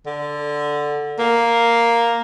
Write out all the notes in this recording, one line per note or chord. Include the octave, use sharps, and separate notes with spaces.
D3
A#3